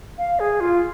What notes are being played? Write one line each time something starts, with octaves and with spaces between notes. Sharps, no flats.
F5
G#4
F4